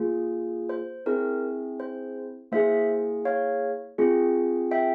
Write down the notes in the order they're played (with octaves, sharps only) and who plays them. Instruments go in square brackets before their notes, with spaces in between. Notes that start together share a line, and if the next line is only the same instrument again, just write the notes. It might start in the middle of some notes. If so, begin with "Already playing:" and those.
Already playing: [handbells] A#3 F4 G#4
C5
C4 E4 G#4 A#4
C5
A#3 E4 G#4 C5 E5
C#5 F5
C4 F4 G#4
E5 G5